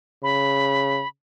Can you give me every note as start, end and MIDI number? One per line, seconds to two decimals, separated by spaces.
0.23 1.01 49
0.23 1.08 83